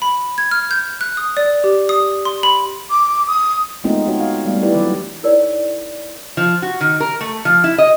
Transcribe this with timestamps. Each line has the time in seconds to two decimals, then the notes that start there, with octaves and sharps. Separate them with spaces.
0.02 B5
0.38 G#6
0.51 F6
0.71 G6
1.01 F#6
1.17 D#6
1.37 D5
1.64 G4
1.89 D#6
2.25 C6
2.43 B5
2.90 D6
3.28 D#6
3.84 G#3 A3 B3 C4 D#4 F4
4.06 D#4 F#4 C#5
4.20 F5
4.45 G3 A3 B3 F5
4.62 D4 E4 G4 B4 D5
4.75 E3 F#3 G4
5.23 D#4 E4 G#4 A#4 C#5 D5
6.37 F3
6.62 F#4
6.81 D#3
7.00 A#4
7.21 A3
7.45 F3
7.64 E4
7.78 D#5